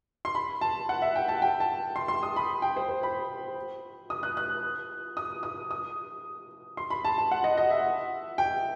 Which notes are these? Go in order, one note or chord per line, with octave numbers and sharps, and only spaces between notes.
C6
B5
A5
F#5
E5
G5
A5
G5
A5
C6
C6
D#6
B5
G5
C5
C5
B5
D#6
F#6
F#6
D#6
D#6
D#6
C6
B5
A5
A5
F#5
D#5
D#5
E5
G5